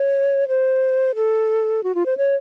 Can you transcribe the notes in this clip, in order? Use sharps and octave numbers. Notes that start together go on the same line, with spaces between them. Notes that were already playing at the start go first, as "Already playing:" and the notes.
Already playing: C#5
C5
A4
F#4
F4
C5
C#5